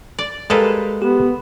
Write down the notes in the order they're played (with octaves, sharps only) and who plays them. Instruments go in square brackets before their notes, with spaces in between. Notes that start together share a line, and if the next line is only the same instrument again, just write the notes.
[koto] D5
[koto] G3 A#3 A4 [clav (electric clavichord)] G#3 B4 F5
[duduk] B3 [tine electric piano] G4